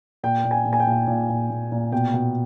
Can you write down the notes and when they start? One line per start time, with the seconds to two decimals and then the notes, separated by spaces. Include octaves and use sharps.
0.23 A#2 G5
0.45 A#2
0.51 G#5
0.65 A#2
0.73 G#5
0.80 G5
0.87 A#2
1.07 A#2
1.30 A#2
1.50 A#2
1.72 A#2
1.92 B2 G5
2.14 B2